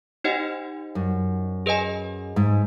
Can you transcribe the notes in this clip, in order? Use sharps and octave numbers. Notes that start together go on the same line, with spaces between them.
D#4 G4 C5 D#5 F#5
F#2
G#4 B4 D#5 G#5
G#2